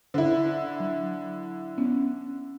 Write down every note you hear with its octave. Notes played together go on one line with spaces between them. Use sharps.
D3 E4 C5
F#3
B3 C#4